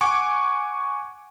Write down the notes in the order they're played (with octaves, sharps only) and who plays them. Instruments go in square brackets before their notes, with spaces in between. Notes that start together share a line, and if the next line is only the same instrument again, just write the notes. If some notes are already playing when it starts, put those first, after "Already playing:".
[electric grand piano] F#5 G#5 C#6 D6